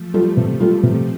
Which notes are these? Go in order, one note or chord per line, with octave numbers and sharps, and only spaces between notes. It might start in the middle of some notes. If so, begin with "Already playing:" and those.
Already playing: F3 A3
G3 F4 A4
C3
G3 F4 A4
C3